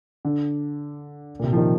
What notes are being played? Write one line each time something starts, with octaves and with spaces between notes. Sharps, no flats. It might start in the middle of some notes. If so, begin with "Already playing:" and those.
D3
A#2
C3
F3
D#3